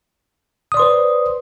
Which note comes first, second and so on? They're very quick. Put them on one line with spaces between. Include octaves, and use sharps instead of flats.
D#6 D5 C6 B4 C5